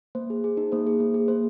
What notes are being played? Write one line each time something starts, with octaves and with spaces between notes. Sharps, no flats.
A#3 C5
G#4
G#4
D#4
A#3 C5
G#4
A#3
G#4
A#3 C5